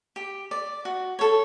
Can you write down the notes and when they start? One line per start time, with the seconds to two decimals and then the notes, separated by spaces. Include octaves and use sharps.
0.16 G4
0.51 D5
0.85 F#4
1.19 A4 C#5